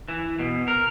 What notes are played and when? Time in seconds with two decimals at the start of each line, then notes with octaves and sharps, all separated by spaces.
0.08 E3
0.39 B2
0.68 A#4